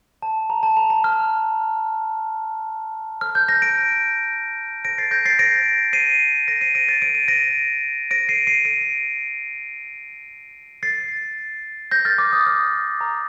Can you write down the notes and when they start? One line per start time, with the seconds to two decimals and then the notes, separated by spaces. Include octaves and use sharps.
0.22 A5
0.50 A#5
0.63 A5
0.77 A#5
0.90 A#5
1.04 F6
3.21 F6
3.35 G6
3.49 G6 A#6
3.62 A#6 D7
4.85 A#6 D7
4.98 A6 C7
5.11 G6 A#6
5.25 A6 C7
5.39 A#6 D7
5.93 C7 D#7
6.48 A#6 D7
6.61 C7 D#7
6.75 A#6 D7
6.88 A6 C7
7.02 D7
7.15 D#7
7.28 A#6 D7
8.11 A#6 D7
8.29 C7 D#7
8.47 C7 D#7
8.65 A#6 D7
10.83 A6 C7
11.91 G6 A#6
12.05 F6 A6
12.18 D6
12.33 D#6
12.46 F6
13.01 A#5